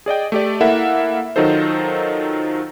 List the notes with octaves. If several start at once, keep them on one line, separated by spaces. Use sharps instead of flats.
G#4 D5 D#5 G5
A3 G4 D5
A#3 E4 A4 A#4 E5 F#5
D#3 F#3 D#4 F4 A4 C5